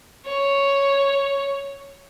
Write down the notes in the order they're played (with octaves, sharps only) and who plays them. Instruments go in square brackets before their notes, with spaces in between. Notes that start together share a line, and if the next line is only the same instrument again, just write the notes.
[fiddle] C#5